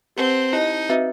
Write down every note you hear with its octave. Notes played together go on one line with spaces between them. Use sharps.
C4 G4 B4 F#5 A5
D#4 E4 G4 D#5
C4 F#4 B4 E5